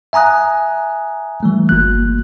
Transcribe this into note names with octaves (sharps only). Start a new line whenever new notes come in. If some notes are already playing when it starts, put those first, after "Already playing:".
E5 G#5 A#5 D#6 F#6
E3 G3 A3
G1 A#3 F#6